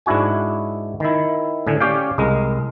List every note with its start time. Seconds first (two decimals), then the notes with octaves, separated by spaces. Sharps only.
0.06 G#2 D4 E4 F#4 G#5
1.00 D#3 E4
1.67 A2 D3 G#5
1.80 C#4 G4 C#5 D5 F5 G5
2.18 C2 G#3 A#4